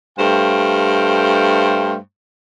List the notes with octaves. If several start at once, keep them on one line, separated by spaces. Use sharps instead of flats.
G2 A3 C5 F5 G5